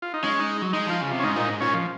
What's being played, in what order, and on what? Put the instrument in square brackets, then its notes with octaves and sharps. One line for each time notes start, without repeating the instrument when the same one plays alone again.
[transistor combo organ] F4
D#4
[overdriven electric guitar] G#3 [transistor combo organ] C#4
[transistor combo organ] D#4
[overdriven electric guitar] F#3
[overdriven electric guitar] G#3 [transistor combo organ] D#4
[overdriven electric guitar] F3 [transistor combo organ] F4
[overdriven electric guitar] C#3
[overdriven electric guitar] C3 [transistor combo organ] F4
[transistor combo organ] C#4
[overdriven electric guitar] G#2 [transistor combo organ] D#4
[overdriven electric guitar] A#2 [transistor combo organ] D#4
[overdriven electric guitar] G#2
[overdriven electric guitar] A#2 [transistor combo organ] C#4
[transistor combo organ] F3